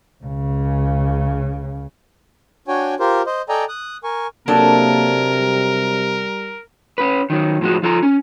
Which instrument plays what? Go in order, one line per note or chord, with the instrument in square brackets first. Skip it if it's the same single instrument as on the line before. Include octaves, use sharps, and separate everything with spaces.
[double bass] C#2 C#3
[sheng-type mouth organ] D4 F#4 C#5 G5 G#5
F4 G4 A#4 C5
C5 D#5
A4 D5 D#5 G5 G#5 A#5
D#6 F#6
A#4 G#5 C#6
[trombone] C3 [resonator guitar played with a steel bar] F#3 D4 A4 [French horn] A#3 [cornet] A#4
[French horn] G3
[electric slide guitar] C#4 B4
D#3 F#3
A2 F3 G#3 F#4
F3 F4 A4 G#5 A#5
C#4